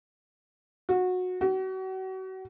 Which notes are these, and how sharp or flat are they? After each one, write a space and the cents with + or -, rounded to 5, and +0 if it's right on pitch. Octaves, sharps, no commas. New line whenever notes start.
F#4 -20
F#4 +35